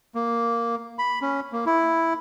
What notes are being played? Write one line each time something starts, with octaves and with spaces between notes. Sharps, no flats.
A#3
B5
C#4
A#3
E4